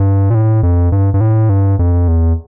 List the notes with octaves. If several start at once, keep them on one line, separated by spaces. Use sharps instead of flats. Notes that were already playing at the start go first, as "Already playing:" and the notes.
Already playing: G2
A#2
A2
F2
G2
G2
A2
G2
F2
E2